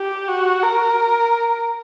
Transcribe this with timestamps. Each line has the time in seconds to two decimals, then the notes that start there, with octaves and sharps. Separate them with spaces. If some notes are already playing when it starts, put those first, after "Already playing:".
Already playing: G4
0.28 F#4
0.63 A#4